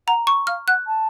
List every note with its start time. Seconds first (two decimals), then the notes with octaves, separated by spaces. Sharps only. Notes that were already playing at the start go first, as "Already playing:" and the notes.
0.08 F#5 A#5
0.27 C#6
0.47 F5 F6
0.68 F#5 F#6
0.87 A5